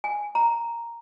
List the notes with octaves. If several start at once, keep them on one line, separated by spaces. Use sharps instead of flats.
G#5
A#5